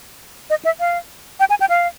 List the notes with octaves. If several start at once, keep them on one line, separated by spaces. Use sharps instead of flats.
D#5
E5
F5
G5
G#5
G5
F5